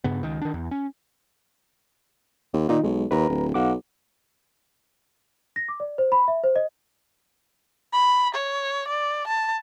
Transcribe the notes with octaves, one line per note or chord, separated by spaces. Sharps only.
G2 C#3 B3
C#2 D#3
D#3 D4
E2
C#4
D#2
A#2 D#3 D#4 F4
B1 G#3
D#2 B4 A#5
D1
B1 F5 F#5 D6
A#6
D6
D5
C5
B5
E5
C5
D#5
B5
C#5
D5
A5